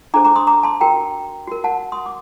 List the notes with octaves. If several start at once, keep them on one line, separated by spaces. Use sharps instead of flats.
D4 A4 C5 A#5 D6
A#5 D6
C6 D#6
A#5 D6
A5 C6
F#4 A#4 G5 A#5
F#4 A#4
F#5 A5
C6 D#6
D6